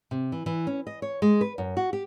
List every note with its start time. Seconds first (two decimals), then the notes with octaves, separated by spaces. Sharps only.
0.11 C3
0.32 E3
0.46 E3
0.67 C#4
0.87 D#5
1.02 C#5
1.22 G#3
1.41 B4
1.58 F#2
1.77 F#4
1.93 G4